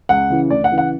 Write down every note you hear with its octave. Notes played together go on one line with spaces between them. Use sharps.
C#2 F#5
C#3 E3
D2 D5
F#5
C#3 E3
F#5